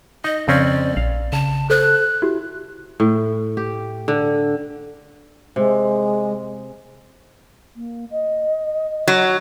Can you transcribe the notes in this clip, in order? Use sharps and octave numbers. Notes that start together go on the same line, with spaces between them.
D#4 D#5
F2 C#3 C4 C#4 D5
A#1 F5
C#3 A5
A4 C5 F#6
E4 F#4 G4
A2
G4
D3
C3 G#3
A#3
D#5
F#3